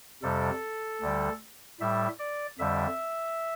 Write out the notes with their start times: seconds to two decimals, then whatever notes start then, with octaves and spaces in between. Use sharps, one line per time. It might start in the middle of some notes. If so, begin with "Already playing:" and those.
0.23 F2 C3 G3 A4
1.01 D2 D3 G3
1.80 A2 G3 E5
2.19 D5
2.59 F2 D3 G3 E5